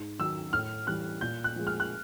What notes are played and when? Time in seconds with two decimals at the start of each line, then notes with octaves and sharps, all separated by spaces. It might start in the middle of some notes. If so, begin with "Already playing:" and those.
Already playing: G#2
0.19 D#3 F#3 E6
0.53 A2 F6
0.87 E3 G3 F#6
1.21 A#2 G6
1.44 F#6
1.56 F3 G#3
1.67 F6
1.80 F#6